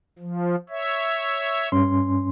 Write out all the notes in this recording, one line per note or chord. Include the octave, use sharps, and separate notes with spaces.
F3
C#5 E5
G2 C#4 C6